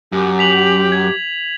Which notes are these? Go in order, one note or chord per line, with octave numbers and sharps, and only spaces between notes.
F#2 G4
B6 F7 F#7
G#6